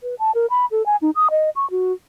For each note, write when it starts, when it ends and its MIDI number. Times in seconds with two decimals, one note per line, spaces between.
0.03 0.15 71
0.19 0.31 81
0.35 0.46 70
0.50 0.66 83
0.71 0.85 69
0.86 0.96 80
1.02 1.10 63
1.15 1.28 87
1.31 1.50 75
1.56 1.69 85
1.71 1.93 66